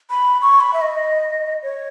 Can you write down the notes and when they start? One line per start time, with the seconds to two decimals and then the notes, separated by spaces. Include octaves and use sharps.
0.10 B5
0.42 C#6
0.61 B5
0.74 E5
0.81 D#5
1.63 C#5